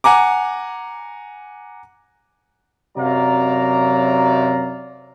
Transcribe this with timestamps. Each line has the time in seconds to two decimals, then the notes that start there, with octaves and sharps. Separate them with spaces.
0.04 F#5 G#5 A#5 D6
2.98 F#2 C3 F#3 D5 F5 A#5